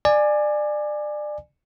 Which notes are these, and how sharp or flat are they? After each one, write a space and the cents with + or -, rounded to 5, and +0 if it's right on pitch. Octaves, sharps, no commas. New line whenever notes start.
D5 +25 G#5 +0